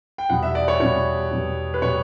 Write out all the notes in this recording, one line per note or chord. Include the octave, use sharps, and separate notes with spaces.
G5
E2 B2 G3 B3 F#5
E5
D5
C#5
E2 B2 G3 B3 C#5
E2 B2 G3 B3
B4
B2 G3 B3 C#5